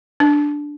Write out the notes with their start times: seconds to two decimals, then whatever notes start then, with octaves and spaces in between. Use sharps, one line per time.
0.20 D4